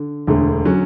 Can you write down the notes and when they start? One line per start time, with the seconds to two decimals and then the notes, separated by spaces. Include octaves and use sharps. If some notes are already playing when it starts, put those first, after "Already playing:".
Already playing: D3
0.27 E1 D2 D3
0.65 D3 F#3 C#4